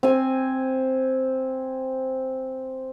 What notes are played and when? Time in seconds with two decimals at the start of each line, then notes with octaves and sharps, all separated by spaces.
0.03 C4 G#5